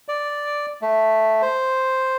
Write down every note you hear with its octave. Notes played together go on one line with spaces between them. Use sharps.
D5
A3
C5